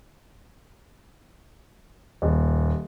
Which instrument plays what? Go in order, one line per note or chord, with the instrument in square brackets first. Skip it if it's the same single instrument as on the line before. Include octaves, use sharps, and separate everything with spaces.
[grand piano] D#1